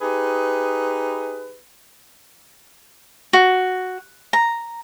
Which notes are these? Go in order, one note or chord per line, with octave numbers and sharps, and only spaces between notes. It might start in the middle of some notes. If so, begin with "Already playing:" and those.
D#4 G4 G#4 B4
F#4
A#5